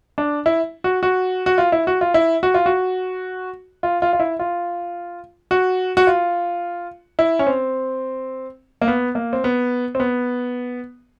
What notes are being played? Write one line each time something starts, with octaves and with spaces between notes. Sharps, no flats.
D4
E4
F#4
F#4
F#4
F4
E4
F#4
F4
E4
F#4
F4
F#4
F4
F4
F4
E4
F4
F#4
F#4
F4
E4
C#4
C4
A#3
B3
A#3
C4
B3
C4
B3